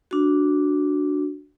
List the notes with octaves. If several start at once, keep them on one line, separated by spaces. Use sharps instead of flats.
D4 F#4